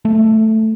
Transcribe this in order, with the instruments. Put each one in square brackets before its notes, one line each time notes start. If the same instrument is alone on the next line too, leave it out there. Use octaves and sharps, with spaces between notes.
[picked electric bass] A3